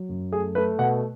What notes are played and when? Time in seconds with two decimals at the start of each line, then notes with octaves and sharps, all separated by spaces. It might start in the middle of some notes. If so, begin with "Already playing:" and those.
Already playing: F#3
0.09 F#2
0.32 A3 G#4
0.55 A3 B4
0.78 B2 F#5